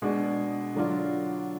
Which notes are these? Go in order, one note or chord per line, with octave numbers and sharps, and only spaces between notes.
B2 G#3 D4
D3 F#3 D4 F4